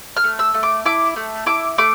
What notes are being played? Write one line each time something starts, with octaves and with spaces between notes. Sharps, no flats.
F6
A3
E6
A3
D6
E4 D6
A3
E4 D6
A3 D6